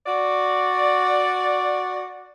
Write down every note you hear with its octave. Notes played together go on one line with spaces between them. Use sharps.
F#4 D5